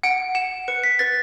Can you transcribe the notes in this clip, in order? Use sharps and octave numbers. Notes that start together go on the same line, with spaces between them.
F#5 D7
F#5 E7
B4 C#7
B6
B4 A6